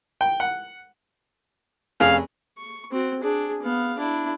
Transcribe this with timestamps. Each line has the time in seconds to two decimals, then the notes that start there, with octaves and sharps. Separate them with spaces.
0.21 G5
0.40 F#5
2.00 F1 C#4 G#4 F5
2.58 C#6
2.92 C4 F#4
3.20 D4 G#4
3.62 B3 F5
3.98 D4 E4